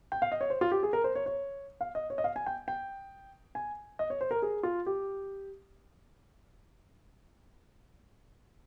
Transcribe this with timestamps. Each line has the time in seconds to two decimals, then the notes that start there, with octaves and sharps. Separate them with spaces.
0.12 G5
0.22 F5
0.32 D#5
0.41 C#5
0.50 C5
0.61 F4
0.72 G4
0.83 G#4
0.93 A#4
1.04 C5
1.15 C#5
1.26 C#5
1.81 F5
1.95 D#5
2.10 C#5
2.18 D#5
2.24 F5
2.36 G#5
2.46 G5
2.68 G5
3.55 G#5
3.99 D#5
4.10 C#5
4.21 C5
4.31 A#4
4.42 G#4
4.63 F4
4.86 G4